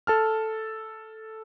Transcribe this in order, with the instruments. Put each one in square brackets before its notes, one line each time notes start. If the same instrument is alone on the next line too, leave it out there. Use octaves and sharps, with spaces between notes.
[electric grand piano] A4 A5 F6